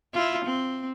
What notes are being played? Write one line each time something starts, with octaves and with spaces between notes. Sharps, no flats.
E4 F4
C4